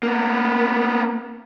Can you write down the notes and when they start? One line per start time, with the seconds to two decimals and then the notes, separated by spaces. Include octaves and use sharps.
0.03 A#3 B3